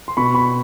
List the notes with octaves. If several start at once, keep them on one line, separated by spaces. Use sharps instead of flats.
C6
B2 B5 C#6
B5 C#6